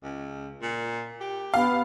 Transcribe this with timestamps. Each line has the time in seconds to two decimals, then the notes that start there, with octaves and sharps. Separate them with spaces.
0.03 C#2
0.62 A#2
1.20 G4
1.54 B3 F5